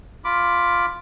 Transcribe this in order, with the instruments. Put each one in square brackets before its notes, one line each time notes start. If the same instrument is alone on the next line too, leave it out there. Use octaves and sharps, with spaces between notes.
[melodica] F4 B5 D6